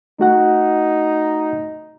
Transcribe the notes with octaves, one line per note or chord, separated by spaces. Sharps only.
A3 D#4 F#4 F#5